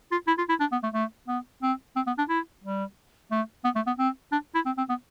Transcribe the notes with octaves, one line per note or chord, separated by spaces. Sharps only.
F4
E4
F4
E4
D4
B3
A3
A3
B3
C4
C4
B3
D4
E4
G3
A3
B3
A3
B3
C4
D4
E4
C4
C4
B3